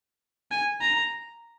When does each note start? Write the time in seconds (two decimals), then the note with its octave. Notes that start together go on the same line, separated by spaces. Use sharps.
0.51 G#5
0.81 A#5